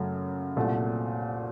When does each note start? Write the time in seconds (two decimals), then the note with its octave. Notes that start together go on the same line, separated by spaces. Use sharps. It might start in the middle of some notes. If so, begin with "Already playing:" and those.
Already playing: F#2 C#3 F#3 A3
0.56 C2 A#2 F#3 A3